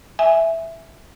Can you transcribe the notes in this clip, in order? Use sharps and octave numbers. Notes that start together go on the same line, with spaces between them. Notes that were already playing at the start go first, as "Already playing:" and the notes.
E5 G#5